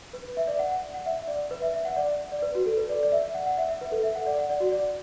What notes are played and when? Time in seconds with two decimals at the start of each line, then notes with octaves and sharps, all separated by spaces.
0.13 B4
0.25 B4
0.37 E5
0.47 D5
0.59 F#5
0.94 F#5
1.06 E5
1.27 D5
1.51 B4
1.62 E5
1.74 E5
1.85 F#5
1.96 D5
2.32 D5
2.42 B4
2.55 F#4
2.66 A4
2.77 B4
2.89 D5
3.03 D5
3.12 E5
3.34 F#5
3.46 F#5
3.57 E5
3.69 E5
3.81 B4
3.91 A4
4.03 E5
4.15 F#5
4.27 D5
4.39 F#5
4.50 D5
4.60 F#4
4.72 D5